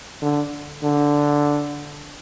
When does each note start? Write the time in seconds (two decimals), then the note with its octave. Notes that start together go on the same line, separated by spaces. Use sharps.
0.22 D3
0.83 D3